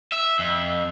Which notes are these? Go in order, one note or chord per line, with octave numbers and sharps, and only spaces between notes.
E5
F2